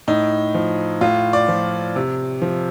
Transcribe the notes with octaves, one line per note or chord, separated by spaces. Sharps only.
A2 D#4
F3
A2 F4
D5
F3
C3
F3